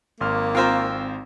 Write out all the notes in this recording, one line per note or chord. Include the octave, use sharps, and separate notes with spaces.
G#1 A#3 C6 F6
C4 F4 A#4 C5 E6